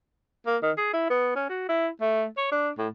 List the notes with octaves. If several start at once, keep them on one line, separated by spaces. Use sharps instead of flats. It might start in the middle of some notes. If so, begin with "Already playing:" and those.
A#3
D#3
G#4
E4
B3
C#4
F#4
E4
A3
C#5
D4
A2